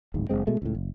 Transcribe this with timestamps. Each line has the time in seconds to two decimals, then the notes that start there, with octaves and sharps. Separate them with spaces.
0.14 D1 G#1 G#2
0.29 F#1 D#2 G#3 C4
0.47 B2 G#3 A3
0.62 C#2 A2
0.75 F#1